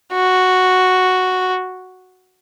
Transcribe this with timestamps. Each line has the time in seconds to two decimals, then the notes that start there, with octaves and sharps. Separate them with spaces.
0.14 F#4